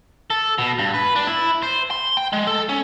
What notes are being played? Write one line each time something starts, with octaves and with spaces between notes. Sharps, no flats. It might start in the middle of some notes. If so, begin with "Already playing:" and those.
A4
B2
G2
B4
D4
E4
C5
C6
G5
G#3
A4
C#4